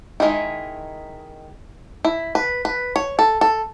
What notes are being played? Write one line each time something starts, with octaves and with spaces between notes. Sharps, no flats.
D#3 G#3 D#4 E4
E4
B4
B4
C#5
A4
A4